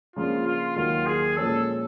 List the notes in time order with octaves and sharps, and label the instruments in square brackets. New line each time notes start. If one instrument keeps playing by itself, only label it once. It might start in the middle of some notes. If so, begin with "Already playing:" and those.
[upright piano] C#3 F3 A#3 D4 [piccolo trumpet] F4
[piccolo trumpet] F4
[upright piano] D#2 D#3 F#3 [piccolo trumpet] F4
[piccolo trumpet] G#4
[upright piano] A#2 F3 G#3 C#4 [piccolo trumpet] A4